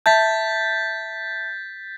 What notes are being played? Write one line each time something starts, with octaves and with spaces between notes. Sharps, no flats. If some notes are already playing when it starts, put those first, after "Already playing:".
E5 A5 G6 A6 B6